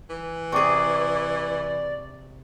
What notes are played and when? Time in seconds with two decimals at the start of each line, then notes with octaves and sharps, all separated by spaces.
0.10 E3
0.52 C3 G#4 D5 C#6 D6